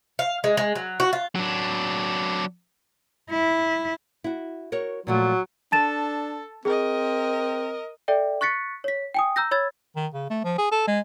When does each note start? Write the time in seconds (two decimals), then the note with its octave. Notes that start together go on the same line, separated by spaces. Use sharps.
0.19 F5
0.44 G#3
0.57 G#3
0.75 F#3
1.00 F#4
1.13 F4
1.35 F#3 D4
3.30 E4
4.24 E4 F#4
4.72 F#4 A#4 C#5
5.07 A#2 F3 F#3 A3
5.72 D4 A4 A5 A6 E7
6.65 C4 G#4 A#4 D#5
8.08 A4 D5 E5 G5
8.41 C#6 F#6 A6 B6 C#7
8.84 C#5 B6
9.14 G5 G#5 D#6
9.36 A#5 E6 G6 A#6
9.51 C#5 B5 E6 G#6 A6
9.96 D#3
10.14 C#3
10.30 A3
10.44 F3
10.58 G#4
10.71 A4
10.87 G#3